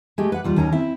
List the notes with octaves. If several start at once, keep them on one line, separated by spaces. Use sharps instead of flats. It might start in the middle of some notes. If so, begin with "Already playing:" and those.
G#3 A3 G4
B4 F#5
D#2 G3 F4
D#2 D#3 C#4 A#4 G#5 A#5
C4 E4 E5